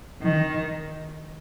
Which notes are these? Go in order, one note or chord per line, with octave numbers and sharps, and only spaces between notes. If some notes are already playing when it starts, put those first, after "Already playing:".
D#3